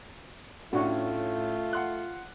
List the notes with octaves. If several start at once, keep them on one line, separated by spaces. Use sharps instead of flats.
A2 A3 C#4 D4 F4 F#4
F#5 C6 F#6